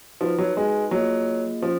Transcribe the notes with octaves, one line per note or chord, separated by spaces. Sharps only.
F3 D#4 F#4 B4
F#3
G#3
F#3 A#3 F4 G#4 D#5
F3 C#4